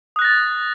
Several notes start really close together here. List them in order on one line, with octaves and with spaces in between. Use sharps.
D#6 F#6 A#6 A6